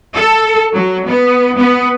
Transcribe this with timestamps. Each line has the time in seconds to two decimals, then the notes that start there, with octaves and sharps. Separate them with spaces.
0.13 A4
0.73 F#3
1.06 B3
1.57 B3